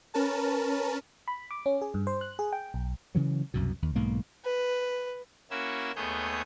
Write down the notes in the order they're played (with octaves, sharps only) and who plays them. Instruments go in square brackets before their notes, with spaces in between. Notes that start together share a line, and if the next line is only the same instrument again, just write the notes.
[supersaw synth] C#4 A#4 B4 A5
[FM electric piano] B5
D6
C#4
G#4
G2
C5
F#6
G#4
G5
B1
[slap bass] C#3 E3 F#3
C2 F#2 B2
D#2
B1 G#2 A#3
[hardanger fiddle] B4
[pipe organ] A#3 C#4 E4 F#4 E6
D#2 A3 B3 G#4 C#5 G6